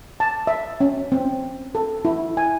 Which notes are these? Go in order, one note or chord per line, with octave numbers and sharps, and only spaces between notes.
A5
E5
C#4
C4
A4
E4
G#5